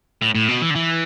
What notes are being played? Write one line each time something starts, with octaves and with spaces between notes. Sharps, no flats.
A2
A2
B2
E3
D3
E3